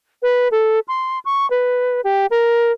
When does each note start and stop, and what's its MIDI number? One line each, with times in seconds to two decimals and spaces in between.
0.22 0.48 71
0.51 0.79 69
0.88 1.19 84
1.25 1.49 85
1.50 2.01 71
2.04 2.26 67
2.31 2.72 70